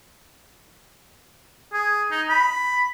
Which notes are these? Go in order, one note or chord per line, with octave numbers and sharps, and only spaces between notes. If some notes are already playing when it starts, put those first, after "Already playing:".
G#4
D#4
B5